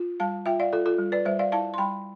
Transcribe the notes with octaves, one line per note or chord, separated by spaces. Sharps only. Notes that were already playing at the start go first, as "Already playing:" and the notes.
Already playing: F4
G3 F5 A5
F4 E5 G5
D5 F5
F4 A4
F4 A4
G3
B4 D5
G3 C5 E5
D5 F5
E4 F5 A5
C6
G3 G5 B5